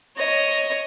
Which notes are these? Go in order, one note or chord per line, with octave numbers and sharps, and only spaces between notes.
C#5 D#5